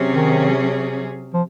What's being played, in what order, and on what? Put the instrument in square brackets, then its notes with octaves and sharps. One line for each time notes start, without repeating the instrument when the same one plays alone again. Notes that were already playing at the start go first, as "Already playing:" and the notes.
Already playing: [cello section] C3 F#3 C#4 G#4
[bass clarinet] D#3
F3